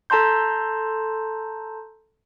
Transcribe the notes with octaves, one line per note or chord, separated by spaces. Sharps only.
A4 A5 A#5 C6 G6